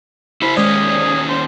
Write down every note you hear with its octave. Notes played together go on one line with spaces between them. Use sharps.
E4 C5 B5
D#2 G#3 C#4 G#4 C5 D5
C5